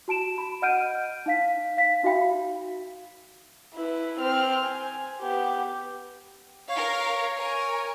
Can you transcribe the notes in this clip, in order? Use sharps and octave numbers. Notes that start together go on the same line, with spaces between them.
F#4 A5 D7 E7
B5
D#5 F#5 F6 G6 D7 D#7
D#4 F5 B6
F5 B6
D#4 F#4 E5 F5 G5 B5
E4 B4
C4 F6
G#5
B3 G4
A#4 C#5 F5
A#4 G#5